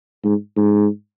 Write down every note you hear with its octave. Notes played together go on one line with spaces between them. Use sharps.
G#2
G#2